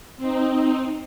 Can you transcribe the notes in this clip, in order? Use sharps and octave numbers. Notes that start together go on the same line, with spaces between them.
C4 D#4